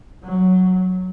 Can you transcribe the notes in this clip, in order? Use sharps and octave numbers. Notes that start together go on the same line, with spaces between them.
F#3